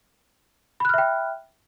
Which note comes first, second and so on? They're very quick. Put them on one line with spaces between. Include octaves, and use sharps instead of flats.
B5 F#6 F6 E5 G5